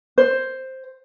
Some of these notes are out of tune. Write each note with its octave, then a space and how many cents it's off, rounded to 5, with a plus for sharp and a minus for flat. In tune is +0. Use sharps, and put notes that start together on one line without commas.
C5 +5